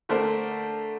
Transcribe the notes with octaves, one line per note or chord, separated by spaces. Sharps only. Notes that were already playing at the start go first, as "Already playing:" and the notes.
D3 A3 D4 A#4 C5